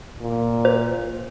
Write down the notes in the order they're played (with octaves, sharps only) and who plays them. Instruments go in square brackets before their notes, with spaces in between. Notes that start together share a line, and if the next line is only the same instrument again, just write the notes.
[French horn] A#2
[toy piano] C5